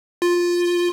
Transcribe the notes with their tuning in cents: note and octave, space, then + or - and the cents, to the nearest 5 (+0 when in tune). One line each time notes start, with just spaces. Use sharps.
F4 +5